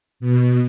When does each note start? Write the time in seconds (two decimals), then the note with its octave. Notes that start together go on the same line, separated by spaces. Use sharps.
0.20 B2